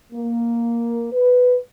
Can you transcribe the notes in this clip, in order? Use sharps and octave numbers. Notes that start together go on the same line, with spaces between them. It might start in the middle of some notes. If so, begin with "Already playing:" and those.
A#3
B4